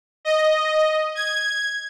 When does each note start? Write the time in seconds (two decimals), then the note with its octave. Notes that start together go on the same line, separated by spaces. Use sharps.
0.25 D#5
1.15 G#6